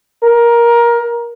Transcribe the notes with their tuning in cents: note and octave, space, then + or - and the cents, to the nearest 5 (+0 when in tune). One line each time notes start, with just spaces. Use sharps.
A#4 +15